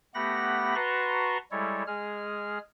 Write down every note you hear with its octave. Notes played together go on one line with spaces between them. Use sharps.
A3 B3 G4 F#5 B5 A#6
F#4 B4 A5 A#5 C6 C#6
G3 G#3 E4 A4 C#5
G#3 G#4 F6